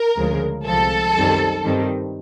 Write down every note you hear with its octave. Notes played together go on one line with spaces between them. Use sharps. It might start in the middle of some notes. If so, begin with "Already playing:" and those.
Already playing: A#4
D2 C#3 F3 G#3
C2 C3 F3 G#3 A4
F#2 D#3 G3 C4
G2 D#3 G3 C4